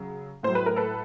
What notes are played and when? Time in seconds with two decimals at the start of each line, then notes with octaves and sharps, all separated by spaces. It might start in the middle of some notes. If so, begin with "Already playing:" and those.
Already playing: C#3 F#3
0.43 A2 F#3 C5
0.55 B4
0.66 A#4
0.76 A4 B4